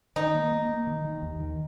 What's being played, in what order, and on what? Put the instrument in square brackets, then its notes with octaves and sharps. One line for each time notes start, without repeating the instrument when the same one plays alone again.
[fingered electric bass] D#3 [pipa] D#4
[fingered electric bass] A#3
A#3
A#3
D#3
D#3
D#2
D#3